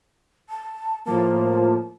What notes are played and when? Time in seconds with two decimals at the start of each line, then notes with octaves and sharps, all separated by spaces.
0.49 A5
1.06 A2 F3 A#3 A5